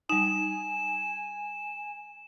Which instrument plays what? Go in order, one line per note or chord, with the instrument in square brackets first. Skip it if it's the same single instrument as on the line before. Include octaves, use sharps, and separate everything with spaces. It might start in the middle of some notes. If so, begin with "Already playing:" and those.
[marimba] G3 D#4 [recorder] G#5 [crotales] E7